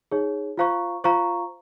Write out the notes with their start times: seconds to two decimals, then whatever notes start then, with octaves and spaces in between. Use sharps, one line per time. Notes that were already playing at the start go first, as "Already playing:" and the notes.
0.11 D#4 G#4 C#5
0.58 F4 C5 F5 A#5 C#6
1.04 F4 C5 F5 A#5 C#6